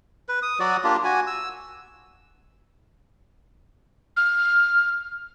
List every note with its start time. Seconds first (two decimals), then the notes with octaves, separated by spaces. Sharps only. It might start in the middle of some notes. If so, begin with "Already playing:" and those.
0.29 B4
0.42 D#6
0.60 F#3 F#4 D5
0.84 A#3 D4 F4 G4
1.04 F#4 G#5
1.27 E6
4.16 F6